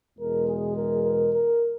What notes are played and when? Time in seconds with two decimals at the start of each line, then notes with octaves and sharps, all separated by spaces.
0.18 E2 B2 G#3 A#4
0.47 G#4
0.76 A#4
1.03 A#4
1.32 A#4